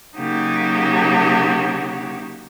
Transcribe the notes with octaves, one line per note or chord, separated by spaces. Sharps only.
C#3 F#3 A#3 D#4 F#4 G4